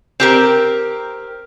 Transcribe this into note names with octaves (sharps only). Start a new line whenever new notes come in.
C4 G4 A#4